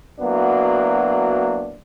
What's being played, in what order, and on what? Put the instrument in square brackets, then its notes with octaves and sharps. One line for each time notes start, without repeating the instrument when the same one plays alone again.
[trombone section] F#3 A#3 B3 D4 E4 F#4